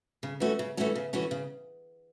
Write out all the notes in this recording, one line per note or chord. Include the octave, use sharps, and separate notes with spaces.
C#3
E3 A3 C#4 F#4
C#3
E3 A3 C#4 F#4
C#3
E3 A3 C#4 F#4
C#3